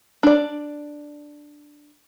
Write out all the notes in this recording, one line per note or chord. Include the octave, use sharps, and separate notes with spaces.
D4 D5